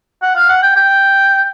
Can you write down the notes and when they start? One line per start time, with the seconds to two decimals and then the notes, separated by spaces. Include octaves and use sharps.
0.22 F#5
0.35 F5
0.49 F#5
0.62 G5
0.76 G5